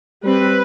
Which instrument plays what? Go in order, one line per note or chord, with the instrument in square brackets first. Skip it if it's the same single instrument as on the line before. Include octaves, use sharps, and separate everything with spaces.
[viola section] G3 C4 B4